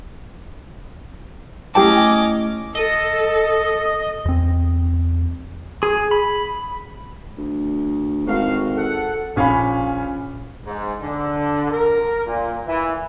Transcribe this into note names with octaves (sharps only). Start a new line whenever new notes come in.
A3 C#4 E4 G4 D#5 G5 A5 D6
A4 D#5
E2 C4
G#4
B5
D2
G#1 A2 F#4 F5
A4 F#5
A#1 C#4 F5 G#5 B5
G#2
D3
A#4
A#2
E3